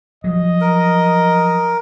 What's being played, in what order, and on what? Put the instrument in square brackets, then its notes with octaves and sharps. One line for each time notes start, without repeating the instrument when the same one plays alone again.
[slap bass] F3 F#3 [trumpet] D#5
[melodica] A#4